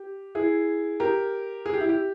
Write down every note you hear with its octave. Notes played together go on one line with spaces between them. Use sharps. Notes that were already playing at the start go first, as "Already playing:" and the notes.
Already playing: G4
E4 G#4
G4 A#4
G#4
G4
E4
G4